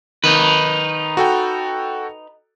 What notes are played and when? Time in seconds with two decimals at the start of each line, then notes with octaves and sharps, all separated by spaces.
0.24 D#3 D#4 B4
1.17 F#4 A4 G5